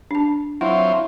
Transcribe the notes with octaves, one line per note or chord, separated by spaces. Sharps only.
D4 A5
F#3 C4 E4 F4 F#5